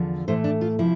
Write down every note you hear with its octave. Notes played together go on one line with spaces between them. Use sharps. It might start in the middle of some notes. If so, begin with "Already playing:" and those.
Already playing: E2 D3 F3
A2 E3 A3 C5
D4
F4
C3 F3 E4